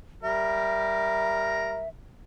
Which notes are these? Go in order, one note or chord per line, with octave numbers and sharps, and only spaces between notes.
G3 A#4 E5